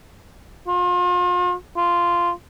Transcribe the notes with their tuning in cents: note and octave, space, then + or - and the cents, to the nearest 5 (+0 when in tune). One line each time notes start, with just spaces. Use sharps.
F4 +35
F4 -10